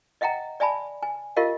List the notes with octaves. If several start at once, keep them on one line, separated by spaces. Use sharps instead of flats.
D#5 E5 F#5 G5 A#5
D5 E5 G#5 A5 B5
G#5
F4 G4 A#4 D#5 F5